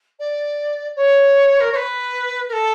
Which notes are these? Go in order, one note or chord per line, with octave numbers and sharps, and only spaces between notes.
D5
C#5
A#4
C#5
B4
A#4
A4